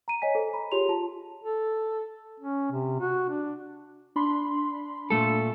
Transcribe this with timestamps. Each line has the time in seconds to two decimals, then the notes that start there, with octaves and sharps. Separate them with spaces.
0.08 A#5 D#7
0.22 C#5 D#5 G#5 B6
0.35 A4 C5
0.53 A#5 B5
0.72 F4 G4 G#4 C#5 C6 F7
0.89 F4 A5
1.43 A4
2.40 C#4
2.72 C3
3.00 F#4
3.30 D4
4.16 D4 B5 C6
5.10 A#2 A3 A4